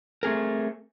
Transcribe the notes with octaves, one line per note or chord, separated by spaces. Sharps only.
A3 C4 G#4 A#4